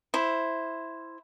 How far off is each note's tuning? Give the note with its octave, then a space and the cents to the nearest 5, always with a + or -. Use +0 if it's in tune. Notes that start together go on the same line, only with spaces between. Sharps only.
E4 +0 C5 +0